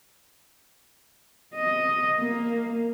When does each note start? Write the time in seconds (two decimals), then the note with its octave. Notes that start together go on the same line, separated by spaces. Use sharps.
1.55 D#5
2.20 A#3